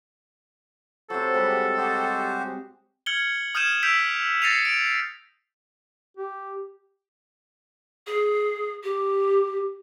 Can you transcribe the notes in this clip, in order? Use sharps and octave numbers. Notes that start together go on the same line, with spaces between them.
C3 F#3 A4 C5
G3 G#3 E5 F#5
F#4 G4 C5 D#5
F6 G#6 C#7 F#7 G7
D#6 F6 G6 G#6 D#7 E7
E6 G6 B6 D7 F7
A6 A#6 C7 C#7 D#7 F7
D7
G4
G#4
G4